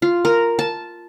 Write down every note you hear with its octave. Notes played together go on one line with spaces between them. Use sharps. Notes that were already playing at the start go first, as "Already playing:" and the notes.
F4
A#4
A5